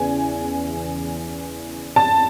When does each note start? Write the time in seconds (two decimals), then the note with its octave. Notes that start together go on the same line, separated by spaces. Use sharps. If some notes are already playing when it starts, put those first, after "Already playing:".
Already playing: E2 C#3 E3 G#5
1.96 A5